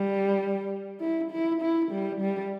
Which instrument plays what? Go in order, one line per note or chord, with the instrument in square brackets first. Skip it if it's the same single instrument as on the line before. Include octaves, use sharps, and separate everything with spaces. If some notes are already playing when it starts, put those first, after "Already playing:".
Already playing: [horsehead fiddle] G3
E4
E4
E4
G3
G3